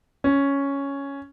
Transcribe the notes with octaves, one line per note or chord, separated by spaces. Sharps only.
C#4